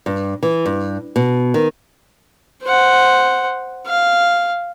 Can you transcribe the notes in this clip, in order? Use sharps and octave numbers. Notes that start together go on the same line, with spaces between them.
G2
E3
G2
B2
D#3
C5 F#5
F5